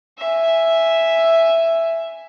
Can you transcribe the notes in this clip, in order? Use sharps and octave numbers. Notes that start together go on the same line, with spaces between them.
E5 G#5